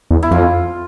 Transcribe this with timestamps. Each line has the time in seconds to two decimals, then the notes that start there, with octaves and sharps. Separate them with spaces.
0.11 E2
0.23 E4
0.31 F2 F4